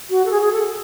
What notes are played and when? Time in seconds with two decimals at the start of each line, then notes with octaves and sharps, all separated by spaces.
0.10 F#4
0.25 A4
0.31 G#4
0.41 G#4
0.52 A4